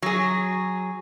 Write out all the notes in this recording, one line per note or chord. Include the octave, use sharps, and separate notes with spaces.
F#3 G#4